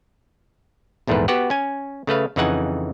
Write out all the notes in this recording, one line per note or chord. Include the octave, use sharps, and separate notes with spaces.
A#1 E2 G#2 A3 A#4 B4
B3 F#4 G4 F#5
C#4 G#5
C#3 A3 B4 F5
F2 C#3 E3 D#4 F#5 G#5